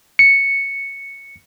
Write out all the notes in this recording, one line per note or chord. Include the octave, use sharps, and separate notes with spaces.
C#7